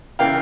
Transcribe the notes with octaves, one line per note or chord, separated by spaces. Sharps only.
C#3 E3 F5 G5